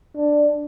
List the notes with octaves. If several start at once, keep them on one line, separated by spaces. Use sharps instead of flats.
D4